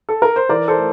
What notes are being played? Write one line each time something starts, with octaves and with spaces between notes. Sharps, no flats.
A4
A#4
C5
E3 A#4 D5
A4 C5
A3